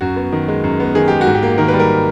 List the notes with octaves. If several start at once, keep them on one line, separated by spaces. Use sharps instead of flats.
F#2 F#4
B3
D#3
G#3
F#2
B3
D#3 G#4
G#3 G4
F#4
G#2
G4
A#3
D#3 A#4
B4
G3
A#4